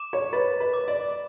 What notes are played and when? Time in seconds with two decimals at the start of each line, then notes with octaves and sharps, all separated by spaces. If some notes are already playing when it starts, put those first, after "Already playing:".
Already playing: D6 E7
0.13 C#5
0.33 B4 A6
0.60 B4
0.73 D6
0.88 D5